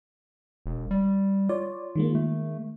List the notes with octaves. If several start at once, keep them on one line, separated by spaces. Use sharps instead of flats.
E1
G3
F4 C#5 D5
D#3 G#3 A#3
A3